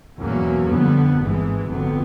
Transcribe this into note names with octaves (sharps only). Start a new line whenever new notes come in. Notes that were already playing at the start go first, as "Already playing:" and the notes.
E2 B2 F#3 A#3 C#4
F2 D3 G3 B3
G#1 G#2 E3 G#3
F1 F2 D3 F#3 B3